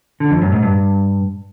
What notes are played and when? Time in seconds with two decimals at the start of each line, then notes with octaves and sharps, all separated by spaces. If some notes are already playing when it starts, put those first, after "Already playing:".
0.20 D3
0.31 F2
0.42 F#2
0.52 G#2
0.63 G2